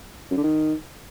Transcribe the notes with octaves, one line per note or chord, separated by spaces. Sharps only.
F#2
D3
D#3